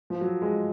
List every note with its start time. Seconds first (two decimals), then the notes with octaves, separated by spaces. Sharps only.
0.10 F3
0.21 F#3
0.42 G#3